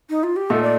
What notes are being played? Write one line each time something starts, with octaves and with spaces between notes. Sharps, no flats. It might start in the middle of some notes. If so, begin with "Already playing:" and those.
D#4
F4
G4
A#2 A3 D#4 A4
D5